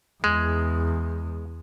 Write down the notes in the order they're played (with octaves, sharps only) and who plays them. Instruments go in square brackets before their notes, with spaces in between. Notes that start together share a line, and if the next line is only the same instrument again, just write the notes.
[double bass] E2 [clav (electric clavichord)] G#3